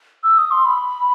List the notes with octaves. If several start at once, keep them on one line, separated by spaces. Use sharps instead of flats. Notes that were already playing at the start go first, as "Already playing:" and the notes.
E6
D#6
C6
B5